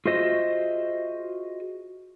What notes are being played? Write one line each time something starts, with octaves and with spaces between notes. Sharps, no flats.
F4 F#4 G#4 C5 D#5 E5